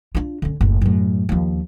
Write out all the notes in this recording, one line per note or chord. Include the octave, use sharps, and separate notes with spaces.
D4 F4
D3 C#4
F#1 A2
F#2 A2
D#2 F3